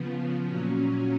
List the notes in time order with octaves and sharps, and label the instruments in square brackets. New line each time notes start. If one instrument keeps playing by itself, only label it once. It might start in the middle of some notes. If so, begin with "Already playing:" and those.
Already playing: [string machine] C#3 F3 B3
A#2 F#3 C#4